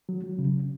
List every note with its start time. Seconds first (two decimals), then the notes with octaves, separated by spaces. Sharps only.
0.09 F#3
0.24 F#3
0.39 C#3